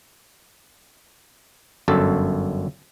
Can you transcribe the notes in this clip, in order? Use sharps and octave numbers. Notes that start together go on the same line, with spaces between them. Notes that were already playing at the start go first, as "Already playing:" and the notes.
G1 F#2 A4